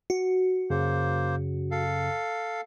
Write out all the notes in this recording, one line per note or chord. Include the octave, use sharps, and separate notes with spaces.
F#4
F#2 C#3 A#3 C5
A4 F5